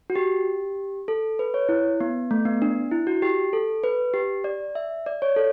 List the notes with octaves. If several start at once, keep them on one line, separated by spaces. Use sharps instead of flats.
F#4
G4
A4
B4
C#5
E4
B3
A3
B3
D4
E4
F#4
G4
A4
B4
G4
D5
E5
D5
C#5
A4